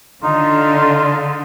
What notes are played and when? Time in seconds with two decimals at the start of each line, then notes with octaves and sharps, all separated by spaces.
0.23 D3 D#4 F4